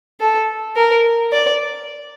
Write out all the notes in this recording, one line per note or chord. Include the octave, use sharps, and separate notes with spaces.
A4
A#4
D5